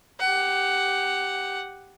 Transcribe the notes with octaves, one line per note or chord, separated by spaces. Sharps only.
G4 F#5